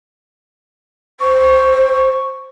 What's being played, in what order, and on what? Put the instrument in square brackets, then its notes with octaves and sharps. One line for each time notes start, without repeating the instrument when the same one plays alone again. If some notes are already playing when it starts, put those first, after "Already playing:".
[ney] C5 [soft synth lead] C#6